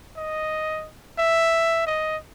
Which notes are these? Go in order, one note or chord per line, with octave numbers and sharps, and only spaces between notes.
D#5
E5
D#5